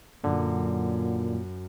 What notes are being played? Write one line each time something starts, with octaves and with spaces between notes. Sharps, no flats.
F#2 A#2 D3